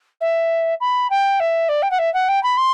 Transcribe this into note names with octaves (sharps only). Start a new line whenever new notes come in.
E5
B5
G5
E5
D5
G5
F#5
E5
F#5
G5
B5
C6